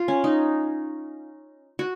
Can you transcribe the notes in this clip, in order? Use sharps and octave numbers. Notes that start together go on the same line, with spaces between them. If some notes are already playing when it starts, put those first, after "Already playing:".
Already playing: F4
C#4
D#4
F#4